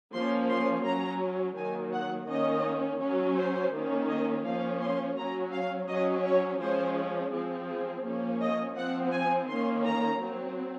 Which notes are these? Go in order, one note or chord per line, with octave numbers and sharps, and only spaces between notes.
F3 A#3 C#4 C6
C6
F#3 C#4 A#5
D#3 F#3 A#3 G#5
F#5
D#3 A#3 C#4 D#5
F#3 C#4
C5
D#3 A#3 C#4
D#5
F3 A#3 C#4 F5
C6
F#3 C#4 A#5
F5
F#3 C#4 D#5
C#5
F3 G#3 C#4 C5
F3 C4 G#4
G#4
F3 A#3 C#4
D#5
F3 C4 F#5
G#5
D#3 A#3 C#4 C6
A#5
F#3 C4